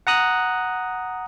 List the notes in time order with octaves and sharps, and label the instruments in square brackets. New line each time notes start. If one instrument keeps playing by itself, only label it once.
[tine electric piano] F#5 A#5 D#6 F#6